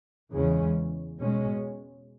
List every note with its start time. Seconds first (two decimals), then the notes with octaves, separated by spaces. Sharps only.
0.32 E2 C#3 E3 G#3 C#4
1.19 B2 G#3 C#4